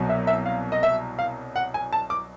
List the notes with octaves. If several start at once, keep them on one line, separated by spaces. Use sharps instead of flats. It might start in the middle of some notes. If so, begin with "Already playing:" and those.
Already playing: C2 B2 F#3
E5
E5
F5
D#5
E5
F5
F#5
G#5
A5
D6